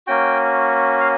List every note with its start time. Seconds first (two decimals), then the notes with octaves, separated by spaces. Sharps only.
0.07 A#3 C#4 F#4 G5
1.00 F5